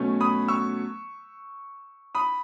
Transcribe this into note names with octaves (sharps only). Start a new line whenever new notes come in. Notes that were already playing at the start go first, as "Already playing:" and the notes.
Already playing: B2 F#3 A3 C#4
B5 D#6
C#6 E6
B5 D#6